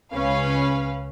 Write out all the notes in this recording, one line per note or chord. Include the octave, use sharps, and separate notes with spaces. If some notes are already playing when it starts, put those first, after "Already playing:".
C#2 C#4 B4 F5